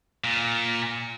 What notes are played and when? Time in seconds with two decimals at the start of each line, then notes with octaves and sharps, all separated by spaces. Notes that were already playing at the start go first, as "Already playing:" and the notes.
0.24 A#2